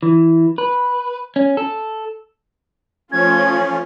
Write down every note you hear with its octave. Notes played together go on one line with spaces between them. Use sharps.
E3
B4
C#4
A4
F3 A3 C#4 F4 G#6